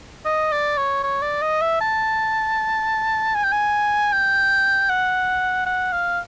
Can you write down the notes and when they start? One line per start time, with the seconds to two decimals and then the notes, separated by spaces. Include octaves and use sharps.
0.25 D#5
0.52 D5
0.77 C#5
1.03 C#5
1.22 D5
1.42 D#5
1.61 E5
1.81 A5
3.35 G#5
3.44 G5
3.52 G#5
4.12 G5
4.90 F#5
5.66 F#5
5.92 F5